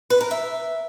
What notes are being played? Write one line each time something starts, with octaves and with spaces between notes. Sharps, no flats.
B4
A#4
E5